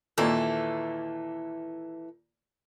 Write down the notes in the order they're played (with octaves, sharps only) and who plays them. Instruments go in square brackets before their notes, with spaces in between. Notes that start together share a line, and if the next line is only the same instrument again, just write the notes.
[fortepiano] D#2 A#2 [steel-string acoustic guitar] E3 A4